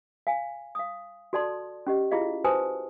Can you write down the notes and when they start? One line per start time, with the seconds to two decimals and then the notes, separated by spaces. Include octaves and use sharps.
0.27 F5 G#5
0.75 F5 D#6
1.33 F#4 A4 D5 A5 C6
1.87 C#4 G4 D#5
2.11 E4 F4 G#4 D#5 F5
2.44 F#4 B4 C5 G#5 A5 D#6